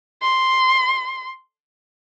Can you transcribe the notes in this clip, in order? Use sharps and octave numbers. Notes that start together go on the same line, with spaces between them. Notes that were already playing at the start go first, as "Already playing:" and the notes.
C6